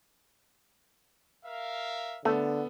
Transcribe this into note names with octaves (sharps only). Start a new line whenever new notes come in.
A#4 E5 F5
D3 A3 B3 A4